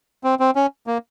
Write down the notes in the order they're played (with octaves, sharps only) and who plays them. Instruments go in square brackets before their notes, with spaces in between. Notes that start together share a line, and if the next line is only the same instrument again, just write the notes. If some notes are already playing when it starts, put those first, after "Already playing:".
[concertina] C4
C4
C#4
A#3